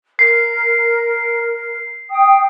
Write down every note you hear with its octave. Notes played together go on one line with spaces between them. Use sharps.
A#4 C7
G5 D#6